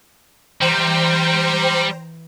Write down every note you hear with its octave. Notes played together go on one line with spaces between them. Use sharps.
E3 G3 C5 G5 A#5